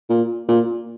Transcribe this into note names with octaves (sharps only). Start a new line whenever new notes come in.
A#2
A#2